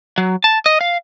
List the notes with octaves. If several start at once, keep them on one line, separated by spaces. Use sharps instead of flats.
F#3
A5
D#5
F5